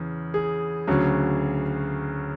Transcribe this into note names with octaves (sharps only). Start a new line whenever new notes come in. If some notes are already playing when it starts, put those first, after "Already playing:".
Already playing: E2 C#3
G#4
D2 C#3 F#3